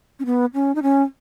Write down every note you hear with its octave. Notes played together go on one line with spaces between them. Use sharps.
C#4
B3
C#4
D#4
C#4